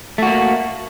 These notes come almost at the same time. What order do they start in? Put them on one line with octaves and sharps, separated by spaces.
A3 F#4 A#3